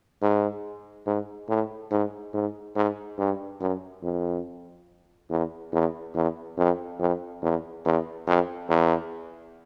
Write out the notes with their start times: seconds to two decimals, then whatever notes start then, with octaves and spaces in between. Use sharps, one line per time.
0.22 G#2
1.06 G#2
1.49 A2
1.91 G#2
2.34 G#2
2.76 G#2
3.18 G2
3.61 F#2
4.03 F2
5.30 E2
5.73 E2
6.15 E2
6.57 F2
7.00 F2
7.42 E2
7.85 E2
8.27 F2
8.69 E2